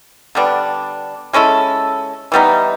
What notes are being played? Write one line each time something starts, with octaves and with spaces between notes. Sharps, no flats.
D3 G3 B3 D4
G#3 C#4 E4 A4
E3 G3 B3 D#4